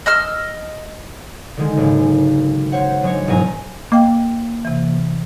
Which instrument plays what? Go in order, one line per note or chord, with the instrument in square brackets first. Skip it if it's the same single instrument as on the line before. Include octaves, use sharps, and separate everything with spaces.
[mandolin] D#5 E6 F6
[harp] D3 D#3 G#3
F#1 G#2
C5 C#5 F#5
F#3 G#3 D4 C#5
E1 G#2 F#3 G#5 A#5
[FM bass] A#3 [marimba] D#5 G5
[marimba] C3 E3